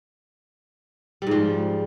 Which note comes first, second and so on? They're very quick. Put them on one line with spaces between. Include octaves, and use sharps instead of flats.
G3 G#2 F3